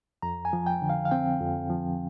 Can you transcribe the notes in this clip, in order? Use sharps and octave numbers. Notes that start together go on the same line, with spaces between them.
F2 A#5
G#5
F3
G5
D3
F5
F5
C4 G5
F2
F3